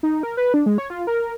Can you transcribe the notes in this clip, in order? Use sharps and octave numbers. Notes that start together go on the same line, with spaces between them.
D#4
A#4
B4
D4
G#3
C#5
F4
A#4